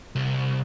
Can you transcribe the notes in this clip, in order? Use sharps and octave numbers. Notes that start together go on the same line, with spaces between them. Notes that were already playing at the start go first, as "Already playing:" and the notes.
C2